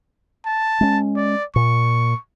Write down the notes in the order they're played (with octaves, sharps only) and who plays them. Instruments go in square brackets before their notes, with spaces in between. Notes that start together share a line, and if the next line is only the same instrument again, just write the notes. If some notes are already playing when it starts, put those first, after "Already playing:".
[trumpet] A5
[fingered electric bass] G#3 C#4
[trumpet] D5
[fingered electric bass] A#2 [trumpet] C#6